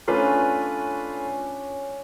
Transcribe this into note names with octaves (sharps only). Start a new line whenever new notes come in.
A3 C#4 D4 F4 B4 D5